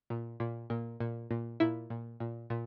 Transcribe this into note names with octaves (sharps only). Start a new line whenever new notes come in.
A#2
A#2
A#2
A#2
A#2
A#2 E4
A#2
A#2
A#2